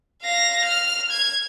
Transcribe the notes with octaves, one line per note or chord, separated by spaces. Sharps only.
F5 A#6
F6
G#6